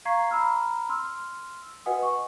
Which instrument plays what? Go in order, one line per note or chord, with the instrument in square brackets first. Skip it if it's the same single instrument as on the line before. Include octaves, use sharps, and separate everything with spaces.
[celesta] F5 A#5 C#6 G#6 C7
A#5 B5 E6 F6
C6 E6 F6
F#4 B4 D#5 F#5 G#5 D#6
C#6